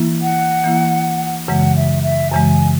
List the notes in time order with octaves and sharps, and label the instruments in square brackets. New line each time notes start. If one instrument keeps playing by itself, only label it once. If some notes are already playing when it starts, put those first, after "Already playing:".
Already playing: [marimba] E3 A#3 E4
[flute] F#5
[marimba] E3 A#3 E4
[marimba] F#2 C#3 E3 G#3 [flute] F#5
[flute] E5
E5
[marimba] F#2 C#3 E3 G#3 [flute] G#5